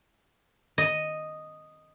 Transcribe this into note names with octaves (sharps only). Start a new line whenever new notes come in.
D#5